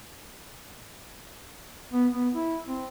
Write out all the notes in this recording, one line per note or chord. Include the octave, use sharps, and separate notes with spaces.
B3
B3
E4
C4